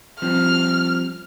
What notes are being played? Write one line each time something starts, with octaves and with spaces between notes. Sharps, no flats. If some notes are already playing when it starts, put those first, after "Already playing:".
F3 G3 C4 F6